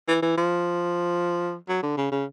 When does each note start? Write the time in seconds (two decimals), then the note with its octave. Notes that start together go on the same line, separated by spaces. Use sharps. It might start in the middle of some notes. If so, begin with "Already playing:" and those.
0.08 E3
0.22 E3
0.38 F3
1.69 F#3
1.83 D3
1.97 C#3
2.12 C#3